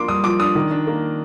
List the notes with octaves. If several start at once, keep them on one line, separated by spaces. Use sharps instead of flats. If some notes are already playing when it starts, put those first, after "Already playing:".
Already playing: F3 A#3 D4 C6 D6
G2 D#6
F3 D6
D4 D#6
D#3
D4
A#3